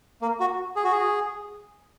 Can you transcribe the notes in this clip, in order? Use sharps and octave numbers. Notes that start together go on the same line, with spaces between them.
A#3
F#4
G#4
F#4
G#4